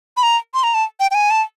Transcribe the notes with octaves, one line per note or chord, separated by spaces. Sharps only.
B5
A#5
C6
A#5
A5
G5
G5
G#5
A5